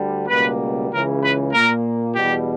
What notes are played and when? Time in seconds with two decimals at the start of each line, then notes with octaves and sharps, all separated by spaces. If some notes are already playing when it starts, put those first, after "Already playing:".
Already playing: D2 D3 G3
0.28 C#2 B2 G3 A#3 B4
0.91 C#2 C#3 E3 A#4
1.22 B4
1.52 A#2 A#3 A#4
2.14 E2 B2 G3 G4